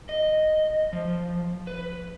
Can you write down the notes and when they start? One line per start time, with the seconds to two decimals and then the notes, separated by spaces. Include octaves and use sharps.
0.09 D#5
0.93 F3
1.67 B4